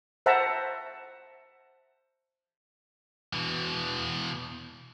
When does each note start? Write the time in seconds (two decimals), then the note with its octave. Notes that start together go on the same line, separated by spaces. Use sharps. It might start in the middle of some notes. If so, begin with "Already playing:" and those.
0.26 C5 E5 F#5 A5 A#5
3.33 B2 E3